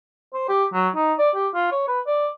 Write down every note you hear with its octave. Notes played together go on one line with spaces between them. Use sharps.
C5
G4
F#3
D#4
D5
G4
F4
C#5
B4
D5